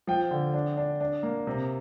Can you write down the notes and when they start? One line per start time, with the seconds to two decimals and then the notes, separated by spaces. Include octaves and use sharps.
0.07 F3 G5
0.31 D3
0.54 D4
0.77 D4
1.00 D4
1.23 A#3
1.47 C3